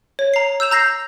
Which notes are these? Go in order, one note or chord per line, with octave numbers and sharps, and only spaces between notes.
C#5
A#5 C7
E6 G6 E7 F7
A#5 G6 A#6 C7